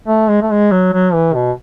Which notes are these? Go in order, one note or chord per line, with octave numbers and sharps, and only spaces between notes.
A3
G#3
A3
G#3
F#3
F#3
E3
B2